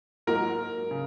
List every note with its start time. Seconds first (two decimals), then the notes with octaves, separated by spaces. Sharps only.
0.27 G#2 F#3 A#3 A#4
0.91 C#3